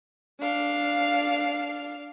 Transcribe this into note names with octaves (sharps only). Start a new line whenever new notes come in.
D4 F5 F6